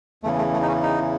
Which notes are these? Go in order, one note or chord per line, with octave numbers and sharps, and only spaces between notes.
E2 C#3 E3 A3
A3
A3
D#4
C#4
D#4